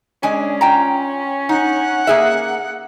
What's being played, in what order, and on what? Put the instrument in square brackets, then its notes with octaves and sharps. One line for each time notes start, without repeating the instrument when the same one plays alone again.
[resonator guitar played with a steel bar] G#3 D4 G#5 [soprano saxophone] C#4
[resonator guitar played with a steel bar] F4 G5 A#5
[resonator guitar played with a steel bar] D#4 [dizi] F#5
[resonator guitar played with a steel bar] A#3 G#4 E5